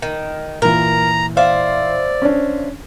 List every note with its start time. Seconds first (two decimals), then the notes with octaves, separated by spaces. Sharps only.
0.02 D#3
0.62 A#2 E3 A#4 A#5
1.37 C5 D5 E5 F5
2.22 C#4 D4